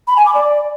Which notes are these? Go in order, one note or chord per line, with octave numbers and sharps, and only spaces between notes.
B5
G#5
D6
D5